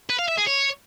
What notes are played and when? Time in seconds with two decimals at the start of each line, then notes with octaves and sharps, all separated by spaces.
0.09 B4
0.19 F5
0.28 E5
0.38 G#4
0.47 C#5